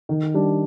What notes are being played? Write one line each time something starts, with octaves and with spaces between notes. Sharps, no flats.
D#3
G3 D4